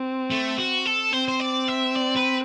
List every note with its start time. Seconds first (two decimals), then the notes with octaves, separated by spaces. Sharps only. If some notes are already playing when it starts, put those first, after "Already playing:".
Already playing: C4
0.30 A3
0.58 F#4
0.85 A4
1.13 C4 C5
1.28 C5
1.40 D5
1.68 E5
1.95 D5
2.16 B4